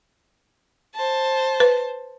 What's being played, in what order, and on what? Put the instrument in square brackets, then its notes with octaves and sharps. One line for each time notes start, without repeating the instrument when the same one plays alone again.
[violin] C5 A5
[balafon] B4